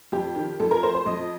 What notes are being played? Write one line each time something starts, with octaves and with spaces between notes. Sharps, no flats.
F2 G4
D#3
F2 A4
A#4
A3 C5
C5
F2 D#5